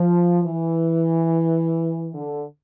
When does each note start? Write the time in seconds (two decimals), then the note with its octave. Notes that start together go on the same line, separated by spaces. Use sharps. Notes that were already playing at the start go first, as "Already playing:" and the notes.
Already playing: F3
0.44 E3
2.14 D3